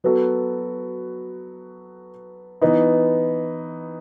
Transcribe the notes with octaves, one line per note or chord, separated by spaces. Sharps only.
F#3 B3 F#4 A4
E3 B3 D#4